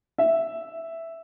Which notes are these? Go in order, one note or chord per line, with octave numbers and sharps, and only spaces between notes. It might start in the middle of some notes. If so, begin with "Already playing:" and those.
E5